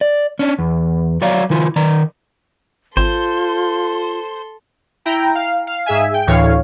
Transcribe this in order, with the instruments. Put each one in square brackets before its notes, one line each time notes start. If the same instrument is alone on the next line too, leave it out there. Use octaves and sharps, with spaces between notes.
[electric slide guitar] D5
C#4 D4
E2
F#3 C#5 D5 F5 A#5
D#3 E4 F4
D#3 D5 A#5
[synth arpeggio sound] G#1 [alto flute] F4 [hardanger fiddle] A4 C6 [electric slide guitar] C5
[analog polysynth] E4 G5 A#5
F5
F5
G#2 G#4 E5 G#5
G5
D2 A2 E3 C#5 F5